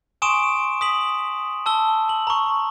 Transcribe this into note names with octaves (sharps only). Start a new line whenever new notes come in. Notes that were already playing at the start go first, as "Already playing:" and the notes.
G#5 C6 C#6 D#6 D7 E7
D#6 B6 F#7
A5 E6 G7
F#7
A#5 C#6